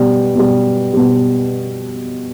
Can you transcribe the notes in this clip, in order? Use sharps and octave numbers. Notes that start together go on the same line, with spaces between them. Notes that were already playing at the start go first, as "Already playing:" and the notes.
Already playing: B2 G3
B2 G3
B2 G3